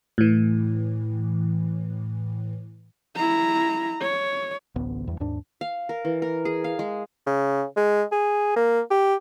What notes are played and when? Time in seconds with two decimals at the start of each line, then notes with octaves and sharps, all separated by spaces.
0.18 A2 E3
3.16 E4 A#5
4.01 C#5
4.76 D1 A1 D2 B3
5.07 E2 G2
5.20 D#2 G#2 D4
5.61 F5
5.89 A#4
6.05 E3
6.22 A#4
6.45 G#4
6.64 F5
6.79 G#3
7.26 C#3
7.77 G#3
8.12 G#4
8.56 A#3
8.91 G4